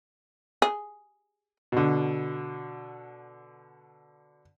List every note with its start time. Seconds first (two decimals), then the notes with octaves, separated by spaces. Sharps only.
0.62 G#4
1.72 B2 D3